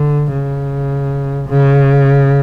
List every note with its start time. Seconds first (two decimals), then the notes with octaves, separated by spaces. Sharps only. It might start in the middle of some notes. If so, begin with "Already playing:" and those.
Already playing: D3
0.33 C#3
1.49 C#3